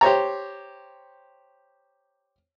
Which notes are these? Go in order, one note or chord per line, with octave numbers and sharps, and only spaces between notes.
G4 C5 C#5 A#5